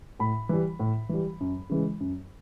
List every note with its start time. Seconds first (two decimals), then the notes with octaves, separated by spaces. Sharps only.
0.20 A2 B5
0.49 E3 G3
0.80 A2
1.09 E3 G3
1.40 F#2
1.70 C#3 E3 G#3
2.00 F#2